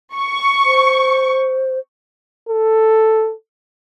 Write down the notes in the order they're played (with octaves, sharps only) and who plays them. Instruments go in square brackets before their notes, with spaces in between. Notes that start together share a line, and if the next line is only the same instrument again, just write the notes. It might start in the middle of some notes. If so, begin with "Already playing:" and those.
[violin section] C#6
[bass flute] C5
[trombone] A4